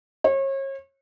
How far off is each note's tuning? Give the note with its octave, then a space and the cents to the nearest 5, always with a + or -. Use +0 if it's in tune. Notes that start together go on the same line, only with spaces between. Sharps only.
C#5 -35